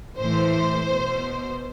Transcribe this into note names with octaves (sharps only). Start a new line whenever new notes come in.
A2 E3 C5
B2